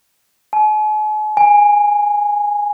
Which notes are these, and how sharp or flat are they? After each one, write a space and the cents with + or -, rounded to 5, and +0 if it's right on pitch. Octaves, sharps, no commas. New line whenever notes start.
G#5 +45
G#5 -10